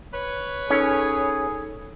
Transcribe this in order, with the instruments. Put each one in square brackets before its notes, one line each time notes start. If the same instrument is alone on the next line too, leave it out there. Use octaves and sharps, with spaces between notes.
[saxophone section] B4 C#5
[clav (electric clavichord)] C#4 [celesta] D#4 A4 E6 [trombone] G#4